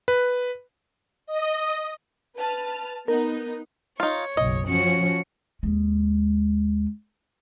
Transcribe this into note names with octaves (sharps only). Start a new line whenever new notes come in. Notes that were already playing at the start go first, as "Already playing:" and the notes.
B4
D#5
B4 A5 F6
B3 D#4 A#4
D#4 F4 C#5
F#1 B1 D#5
F3 C#4 F#4 C#7
D#2 G#3